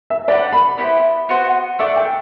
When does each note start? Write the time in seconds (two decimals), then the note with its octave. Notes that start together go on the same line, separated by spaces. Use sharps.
0.10 E5
0.28 D4 G4 B4 D5 F#5
0.53 B5
0.78 B3 E4 G4 C5
1.29 B3 F#4 C5
1.79 A3 D4 A4 D5 E5
1.96 G5